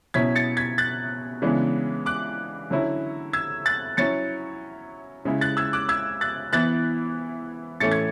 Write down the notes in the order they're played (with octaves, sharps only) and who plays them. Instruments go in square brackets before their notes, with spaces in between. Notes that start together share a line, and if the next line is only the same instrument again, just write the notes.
[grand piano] B2 F#3 C#4 E4 G#6 B6
A6 C#7
G#6 B6
F#6 A6
C#3 E3 G#3 B3 D4
D6 F#6
D3 F#3 C#4 E4
E6 G#6
F#6 A6
F#3 C#4 E4 A6 C#7
C#3 G#3 C#4 E4
F#6 A6
E6 G#6
D6 F#6
E6 G#6
F#6 A6
E3 B3 E4 F#6 A6
A2 E3 A3 C#4 A6 C#7
G#6